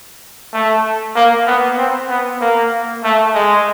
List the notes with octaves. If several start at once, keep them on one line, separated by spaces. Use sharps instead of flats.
A3
A#3
B3
C4
B3
A#3
A3
G#3